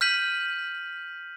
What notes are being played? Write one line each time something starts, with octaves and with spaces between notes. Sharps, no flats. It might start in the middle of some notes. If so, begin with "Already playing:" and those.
F6 G6 B6 D#7 F#7